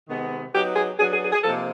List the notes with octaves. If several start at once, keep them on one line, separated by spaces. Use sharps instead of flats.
C3 D#3 G#3 B3
F#3 B3 D#4 G4
G#4
F#3 B3 D4 G#4
G#4
G#4
G#4
C3 F3 A#3 D#4 A4